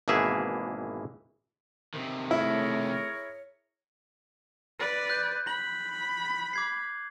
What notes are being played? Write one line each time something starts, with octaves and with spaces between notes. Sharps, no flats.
G#1 B2 E3 A#3 G#4 E5
C3 D#3
A3 E4 G#4 A#4 C#5
B4 D5
F#6 G6
B5 F#7
D6 G#6 C7